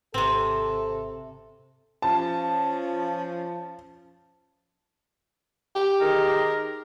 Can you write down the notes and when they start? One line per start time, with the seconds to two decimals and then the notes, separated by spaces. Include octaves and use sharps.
0.14 G#1 C3 C4 A4
2.02 F3 C#4 A5
5.75 G4
6.01 D#3 G#4 A#4